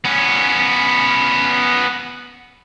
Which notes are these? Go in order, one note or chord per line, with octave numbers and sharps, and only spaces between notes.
B3 C#4